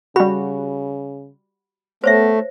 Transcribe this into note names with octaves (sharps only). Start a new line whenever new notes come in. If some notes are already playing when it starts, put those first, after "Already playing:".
C#3 G3 F#4 B5
A3 B3 C5 C#5 E5